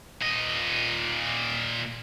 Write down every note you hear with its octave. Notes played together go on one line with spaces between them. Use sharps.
A#2 D#5